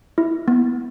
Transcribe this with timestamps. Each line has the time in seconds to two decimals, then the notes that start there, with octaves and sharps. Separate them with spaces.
0.18 E4
0.48 B3